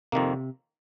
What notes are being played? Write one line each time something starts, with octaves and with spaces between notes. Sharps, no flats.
F2 C3 D#3 A#3